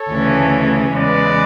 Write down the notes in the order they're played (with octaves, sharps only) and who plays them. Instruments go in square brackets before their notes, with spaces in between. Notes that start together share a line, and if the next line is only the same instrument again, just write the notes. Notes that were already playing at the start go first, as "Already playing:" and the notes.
Already playing: [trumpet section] A4 C#5
[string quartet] D2 C#3 E3 A3 C#4
[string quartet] E2 C#3 G#3 [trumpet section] B4 D5